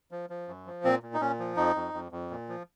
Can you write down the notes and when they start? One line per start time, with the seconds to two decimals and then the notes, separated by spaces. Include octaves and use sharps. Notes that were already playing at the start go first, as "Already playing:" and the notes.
0.11 F3
0.30 F3
0.48 F#2
0.66 F3
0.84 A#2 C4
1.03 A#2
1.14 D#4
1.21 A#2 C#4
1.39 F3
1.57 F2 D#4
1.75 F2
1.94 F2
2.12 F2
2.30 A#2
2.48 F3